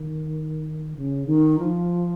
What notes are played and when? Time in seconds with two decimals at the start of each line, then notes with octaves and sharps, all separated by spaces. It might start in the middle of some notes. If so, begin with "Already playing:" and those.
Already playing: D#3
0.96 C#3
1.27 D#3
1.59 F3